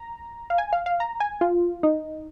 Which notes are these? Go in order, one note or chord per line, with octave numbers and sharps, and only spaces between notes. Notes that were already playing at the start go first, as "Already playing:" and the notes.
Already playing: A#5
F5
G#5
F5
F5
A#5
G#5
F4
D#4